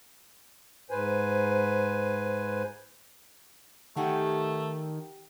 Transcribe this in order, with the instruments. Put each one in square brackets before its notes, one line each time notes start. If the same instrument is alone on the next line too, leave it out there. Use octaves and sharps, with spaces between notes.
[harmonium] G#2 B4 C5 G#5
[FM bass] D#3 [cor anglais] A3 [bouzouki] G4 F#5 G#5